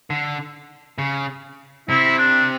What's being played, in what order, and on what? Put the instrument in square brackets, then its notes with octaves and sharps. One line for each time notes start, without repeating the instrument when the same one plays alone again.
[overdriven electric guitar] D3
C#3
[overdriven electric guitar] C3 [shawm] E4
[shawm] D4